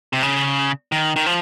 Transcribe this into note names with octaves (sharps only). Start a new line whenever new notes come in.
C3
C#3
D#3
D#3
F3